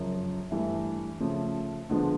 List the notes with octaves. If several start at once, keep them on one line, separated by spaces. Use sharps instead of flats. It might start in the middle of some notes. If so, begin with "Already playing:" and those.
Already playing: F#2 C#3 F3
G2 E3 A3
C#3 F3 A3
D3 F3 G#3 B3 D4